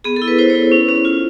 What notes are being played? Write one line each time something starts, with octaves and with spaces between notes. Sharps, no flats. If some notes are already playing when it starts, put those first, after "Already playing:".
B3 G#4
A4
E4
B4
E4 C5
C#5
E4
C#4
C#4
F4